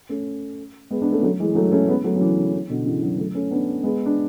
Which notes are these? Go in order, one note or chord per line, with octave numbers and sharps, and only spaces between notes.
A3 C#4
G#3 B3
B3 D4
A3 C#4
F#3 A3
E3 G#3
F#3 A3
A3 C#4
G#3 B3
F#3 A3
F#3
C#3 E3
C#3
C#3
B2 D3
C#3 E3
D3 F#3
F#3 A3
A3 C#4
B3 D4
G#3 B3
D4